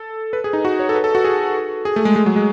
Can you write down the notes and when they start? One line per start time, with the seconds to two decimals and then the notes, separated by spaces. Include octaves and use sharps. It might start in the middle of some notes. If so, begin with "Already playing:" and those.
Already playing: A4
0.33 B4
0.44 G#4
0.53 D#4
0.65 F#4
0.79 C#5
0.89 A4
0.95 B4
1.04 A4
1.15 F#4
1.25 G#4
1.85 G#4
1.96 A3
2.05 G#3
2.16 G#3
2.26 F#3
2.36 G#3